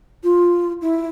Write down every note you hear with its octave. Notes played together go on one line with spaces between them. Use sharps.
F4
E4